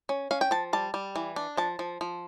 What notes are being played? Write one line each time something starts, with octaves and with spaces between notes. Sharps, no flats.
C#4
C#4 F5
G5
F3 A5
G3 A5
G3
E3
D4
F3 A5
F3
F3